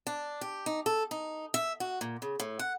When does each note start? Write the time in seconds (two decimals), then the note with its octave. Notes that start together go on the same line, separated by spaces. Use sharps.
0.07 D4
0.41 G4
0.66 D#4
0.86 A4
1.11 D#4
1.54 E5
1.80 F#4
2.01 A#2
2.22 C#3
2.40 A2
2.59 F#5